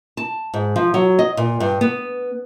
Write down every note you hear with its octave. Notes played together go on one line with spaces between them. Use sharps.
A5
G#2
F3
F#3
D#5
A#2
G2
B3